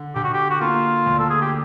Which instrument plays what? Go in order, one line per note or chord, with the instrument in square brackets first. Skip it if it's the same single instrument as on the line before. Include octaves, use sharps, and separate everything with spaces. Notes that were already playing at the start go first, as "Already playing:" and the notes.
Already playing: [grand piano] D3
[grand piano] D3 [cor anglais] G4
[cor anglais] F#4
G4
F#4
[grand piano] A#3 [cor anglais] F4
[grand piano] D2
[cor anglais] A4
G#4
G4